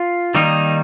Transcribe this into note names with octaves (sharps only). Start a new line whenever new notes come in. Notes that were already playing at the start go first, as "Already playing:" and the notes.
Already playing: F4
D#3 G3 A#3 D#4